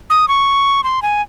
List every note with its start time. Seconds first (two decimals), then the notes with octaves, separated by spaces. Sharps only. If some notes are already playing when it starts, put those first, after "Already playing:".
0.10 D#6
0.28 C#6
0.84 C6
1.02 G#5